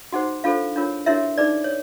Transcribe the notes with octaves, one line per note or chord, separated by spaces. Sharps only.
D#4 F#4 G#4 C5 F#5
D4 F4 A4 C5 F5
D4 F4 A#4 C#5
D4 E4 F#4 A#4 C#5 E5
D#4 G#4 B4 D5
C#5